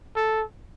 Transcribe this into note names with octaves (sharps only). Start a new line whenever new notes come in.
A4